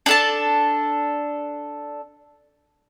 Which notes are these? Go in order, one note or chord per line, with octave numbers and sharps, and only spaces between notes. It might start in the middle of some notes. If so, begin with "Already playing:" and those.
D4 A4 A5